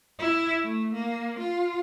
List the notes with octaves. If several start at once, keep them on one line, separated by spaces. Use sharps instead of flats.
E4
A3
A#3
F4